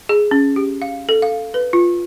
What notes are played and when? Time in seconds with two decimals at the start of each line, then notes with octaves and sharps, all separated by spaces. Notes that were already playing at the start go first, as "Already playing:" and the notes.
0.09 G#4
0.31 C#4
0.56 G4
0.82 F5
1.09 A4
1.22 F5
1.54 B4
1.73 F4